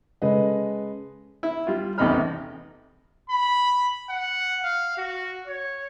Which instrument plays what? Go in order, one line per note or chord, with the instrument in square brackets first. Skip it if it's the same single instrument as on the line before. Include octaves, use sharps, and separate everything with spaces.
[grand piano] C#3 G#3 A4 B4 D#5
[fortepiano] E4
G3 F4
A1 E2 C3 D#4 B5 F6
[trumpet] B5
F#5
F5
F#4
C#5